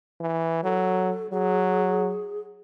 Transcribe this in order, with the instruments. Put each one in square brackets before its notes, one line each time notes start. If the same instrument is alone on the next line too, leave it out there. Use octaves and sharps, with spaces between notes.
[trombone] E3
[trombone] F#3 [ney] A4
[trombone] F#3 [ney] G#4